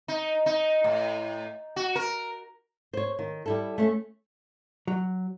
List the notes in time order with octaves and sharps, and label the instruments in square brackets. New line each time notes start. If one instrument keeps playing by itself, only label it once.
[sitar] D#4
D#4
A2
F#4
A#4
[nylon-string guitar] C5 C#5
D#3
G3 E4 A4
A3 C#4
[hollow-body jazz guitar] F#3